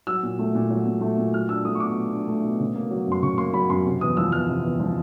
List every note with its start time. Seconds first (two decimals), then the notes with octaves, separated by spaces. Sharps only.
0.07 F#3 E6
0.23 A#2
0.39 A3
0.55 A#2
0.70 F#3
0.86 A#2
1.01 A3
1.18 A#2
1.34 F#3 F6
1.49 D4 E6
1.65 A3 D#6
1.75 C#6
1.80 B2 D6
1.96 F#3
2.13 D4
2.28 A3
2.44 B2
2.60 C#3
2.75 A#3
2.91 F#3
3.07 F#2 C6
3.22 C#3 C#6
3.38 A#3 C6
3.54 F#3 B5
3.70 F#2 C6
3.85 C3
4.01 E2 D#6
4.17 F3 E6
4.32 E2 F6
4.49 C3
4.64 E2
4.80 F3